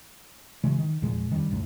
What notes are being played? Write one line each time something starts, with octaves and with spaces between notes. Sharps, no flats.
C#3 E3 F#3 G#3
D#3
E2 A#2 F3 G#3
F2 D#3 G3
C#2 F#2 A2